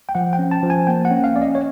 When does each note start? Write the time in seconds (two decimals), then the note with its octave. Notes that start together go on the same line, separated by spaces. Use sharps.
0.09 G5
0.15 F3 F#5
0.33 G5
0.39 C#4
0.51 A5
0.63 F3
0.70 G#5
0.87 A#3 G5
1.05 F#5
1.11 C#4
1.24 F5
1.36 C#4 D5
1.42 D#5
1.55 C#5